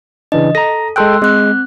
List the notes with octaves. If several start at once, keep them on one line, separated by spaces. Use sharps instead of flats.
C#3 E3 D4 D#5
A4 A#5 A#6
G#3 A4 G5 C6 E6 F#6
G#3 C4 F#6